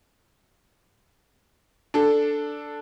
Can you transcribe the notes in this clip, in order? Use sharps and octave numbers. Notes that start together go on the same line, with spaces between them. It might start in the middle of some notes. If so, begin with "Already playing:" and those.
D4 A4